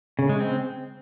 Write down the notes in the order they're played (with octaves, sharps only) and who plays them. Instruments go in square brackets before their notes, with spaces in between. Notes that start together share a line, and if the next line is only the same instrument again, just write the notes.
[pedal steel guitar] C#3
G#3
C4